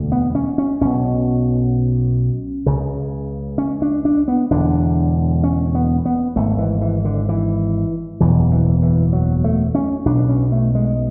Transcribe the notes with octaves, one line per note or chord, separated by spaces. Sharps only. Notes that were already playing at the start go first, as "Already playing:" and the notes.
Already playing: E1 D2 D3
B3
C#4
C#4
B1 B2 C#4
C#2 C#3
C#4
D4
D4
B3
E1 E2 D3 D4
C#4
B3
B3
G#1 G#2 A3
E3
E3
D3
E3
F#1 E2 B2 E3
E3
E3
F#3
A3
C#4
B1 B2 D4
C#4
A3
G#3